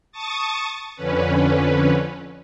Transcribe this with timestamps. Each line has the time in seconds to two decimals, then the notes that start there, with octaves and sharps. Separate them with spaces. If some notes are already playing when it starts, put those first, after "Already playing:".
0.12 A5 C#6 D#6 A6
0.96 F2 D3 C#4 B4